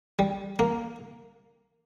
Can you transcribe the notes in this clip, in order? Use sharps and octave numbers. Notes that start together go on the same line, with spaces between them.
G3
A#3